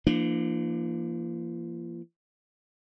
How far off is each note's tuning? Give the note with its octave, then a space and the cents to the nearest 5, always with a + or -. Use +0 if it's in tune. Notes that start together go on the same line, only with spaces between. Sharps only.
F3 -45 A#3 +0 D4 +25